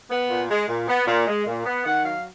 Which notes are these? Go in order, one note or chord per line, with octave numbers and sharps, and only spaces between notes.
B3
A#2
G#3
A#2
B3
A#2
G#3
A#2
B3
D#3 F#5
F#3 F5